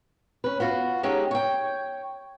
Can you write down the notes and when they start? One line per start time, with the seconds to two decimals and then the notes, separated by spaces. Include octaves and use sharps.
0.44 C#4 B4
0.60 B3 F4 F#4
1.03 G#3 C#4 D#4 G4 A4
1.31 C#5 G5